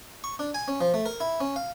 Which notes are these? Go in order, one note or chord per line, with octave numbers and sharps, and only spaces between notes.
C#6
D4
G#5
C#4
F3
A3
A#4
E4
C#4
F5